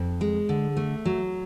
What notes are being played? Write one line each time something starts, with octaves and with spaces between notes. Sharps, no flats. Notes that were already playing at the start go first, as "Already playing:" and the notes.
Already playing: F2
G#3
D3
A3
F#3